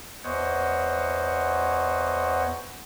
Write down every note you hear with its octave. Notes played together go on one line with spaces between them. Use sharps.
E2 C5 C#5 D#5 F#5